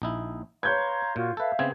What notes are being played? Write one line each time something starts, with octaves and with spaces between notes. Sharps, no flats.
A#1 D#4 E4
B4 C#5 F5 A#5 C6 G6 G#6
A#2 F4 F#4
A4 B4 E5 F5
C#3 B3 C4 G#6